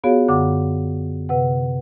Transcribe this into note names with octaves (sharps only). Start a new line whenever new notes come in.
B3 F4 F#4 G#4 C#5 F5
F#2 D3 F#5 D6
C3 B4 F#5